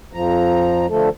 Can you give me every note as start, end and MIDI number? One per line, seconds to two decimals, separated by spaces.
0.13 0.86 41
0.13 0.86 53
0.13 0.86 82
0.89 1.09 50
0.89 1.09 53
0.89 1.09 57
0.89 1.09 69